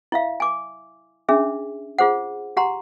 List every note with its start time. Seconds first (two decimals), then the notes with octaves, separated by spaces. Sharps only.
0.12 E4 E5 F5
0.40 G#5 D6
1.29 C#4 D4 G#4 E5
1.99 F4 G#4 C5 F#5
2.57 G4 F#5 A#5 C6